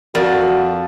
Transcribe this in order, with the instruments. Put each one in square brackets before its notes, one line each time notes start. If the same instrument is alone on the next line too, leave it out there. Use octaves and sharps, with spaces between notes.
[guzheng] F2 [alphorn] F#4 [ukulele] A#4 D5